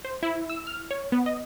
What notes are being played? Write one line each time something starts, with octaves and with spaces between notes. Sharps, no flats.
C5
E4
E6
F6
C#5
B3
D#5